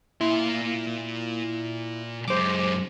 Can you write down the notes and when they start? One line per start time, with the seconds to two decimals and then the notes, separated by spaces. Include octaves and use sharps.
0.21 A#2 E4 C6
2.28 F#2 G#3 C5 D6